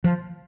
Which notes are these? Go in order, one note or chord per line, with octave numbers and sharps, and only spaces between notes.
F3